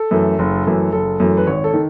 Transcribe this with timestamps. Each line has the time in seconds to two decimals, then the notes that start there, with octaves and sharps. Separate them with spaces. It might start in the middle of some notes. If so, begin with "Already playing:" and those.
Already playing: A4
0.11 F#2 E3 A3
0.39 F#1
0.66 F#2 E3 A3
0.92 F#1 A4
1.20 F#2 E3 A3
1.37 B4
1.47 G#1 C#5
1.64 A4
1.74 D#3